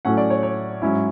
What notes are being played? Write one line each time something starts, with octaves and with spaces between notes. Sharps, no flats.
A2 F#3 A3 C#4 F#5
D5
C#5
C#5
G#2 F#3 C#4 E4